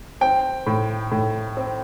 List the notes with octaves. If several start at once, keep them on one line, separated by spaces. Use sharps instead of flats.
C4 G5
A2
A2
C4